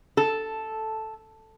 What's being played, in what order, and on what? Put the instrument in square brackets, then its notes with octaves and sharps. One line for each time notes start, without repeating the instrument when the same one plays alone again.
[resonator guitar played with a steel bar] A4